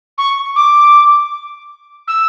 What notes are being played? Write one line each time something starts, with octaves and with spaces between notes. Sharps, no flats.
C#6
D6
E6